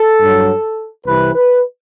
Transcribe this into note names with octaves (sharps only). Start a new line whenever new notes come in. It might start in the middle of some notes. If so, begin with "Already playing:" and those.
Already playing: A4
G2 F#3
C2 C3 E3 B4
B4